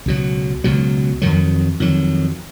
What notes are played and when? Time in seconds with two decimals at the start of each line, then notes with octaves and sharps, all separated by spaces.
0.06 C#2 B2 F#3
0.64 C#2 B2 F#3
1.22 F2 D#3 F#3
1.80 F2 D#3 F#3